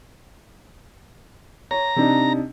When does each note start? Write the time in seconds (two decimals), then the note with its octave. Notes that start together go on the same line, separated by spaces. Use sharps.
1.71 C#5 A#5
1.96 C3 D4 D#4